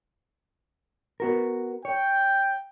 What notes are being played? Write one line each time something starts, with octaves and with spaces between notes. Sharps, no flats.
B3 F#4 A#4
C#5 G5